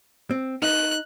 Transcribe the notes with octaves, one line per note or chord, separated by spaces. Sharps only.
C4
D#4 F#6